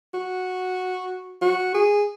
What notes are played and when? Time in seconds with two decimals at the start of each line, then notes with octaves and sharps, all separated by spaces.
0.14 F#4
1.42 F#4
1.75 G#4